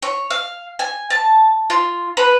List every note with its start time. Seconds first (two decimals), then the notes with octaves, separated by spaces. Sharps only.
0.02 C#5
0.30 F5
0.79 G#5
1.10 A5
1.70 F4
2.17 B4